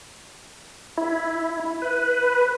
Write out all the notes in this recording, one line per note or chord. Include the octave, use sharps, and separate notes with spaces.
E4
B4